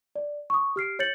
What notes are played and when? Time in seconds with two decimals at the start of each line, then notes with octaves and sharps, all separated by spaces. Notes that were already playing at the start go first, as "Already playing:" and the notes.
0.16 D5
0.50 C#6 D#6
0.76 G4 F6 C7 D7
0.99 C#5 G6 A6 C#7 F#7